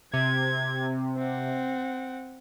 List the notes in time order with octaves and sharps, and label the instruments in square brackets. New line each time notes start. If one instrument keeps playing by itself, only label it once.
[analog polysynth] C3 [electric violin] G#6
[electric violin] C4 F#5